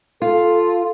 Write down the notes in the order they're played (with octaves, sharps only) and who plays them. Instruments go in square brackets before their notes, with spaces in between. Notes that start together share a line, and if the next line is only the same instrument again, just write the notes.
[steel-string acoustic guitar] F4 [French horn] A4